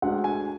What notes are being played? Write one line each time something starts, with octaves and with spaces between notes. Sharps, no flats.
D2 D3 G#3 F#5
G#5